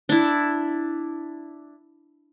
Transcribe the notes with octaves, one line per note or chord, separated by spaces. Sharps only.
D4 E4